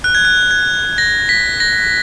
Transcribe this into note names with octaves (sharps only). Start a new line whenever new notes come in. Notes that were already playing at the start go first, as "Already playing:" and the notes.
F#6
G#6
F#6
G#6
A#6
B6
A#6